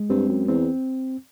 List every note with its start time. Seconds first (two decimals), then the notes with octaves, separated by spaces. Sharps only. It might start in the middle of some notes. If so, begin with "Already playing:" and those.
Already playing: G#3
0.10 G2 C4
0.29 F#2
0.48 E2 C4